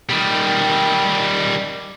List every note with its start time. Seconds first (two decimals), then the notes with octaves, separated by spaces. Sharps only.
0.09 D#3 G3